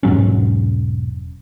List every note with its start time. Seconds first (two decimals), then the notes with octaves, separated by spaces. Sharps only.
0.03 E1 G#2 F#3 C#4